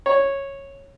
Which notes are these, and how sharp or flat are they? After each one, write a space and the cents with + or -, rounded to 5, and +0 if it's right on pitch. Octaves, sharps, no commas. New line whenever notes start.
C#5 -10